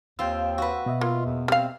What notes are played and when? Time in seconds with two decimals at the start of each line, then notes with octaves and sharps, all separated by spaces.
0.19 D#2 C4 F4 G5 E6
0.58 F#4 B4
0.86 B2 D#5 E5
1.01 A#3 F4
1.25 E2
1.48 G3 C4 F5